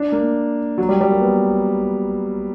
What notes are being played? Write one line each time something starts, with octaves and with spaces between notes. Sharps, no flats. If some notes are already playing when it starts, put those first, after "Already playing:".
Already playing: D4
A#3
F#3
G3
G3
A#3
B3